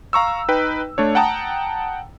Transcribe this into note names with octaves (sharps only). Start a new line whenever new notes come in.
F5 A#5 C#6 E6
D#4 B4 G5
A3 D4 C#5
F#5 G5 A5 A#5 D#6